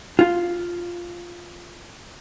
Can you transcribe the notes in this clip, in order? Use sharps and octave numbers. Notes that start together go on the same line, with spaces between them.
F4